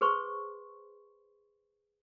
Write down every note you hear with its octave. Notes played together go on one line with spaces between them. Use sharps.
G#4 B4 C5 C6 C#6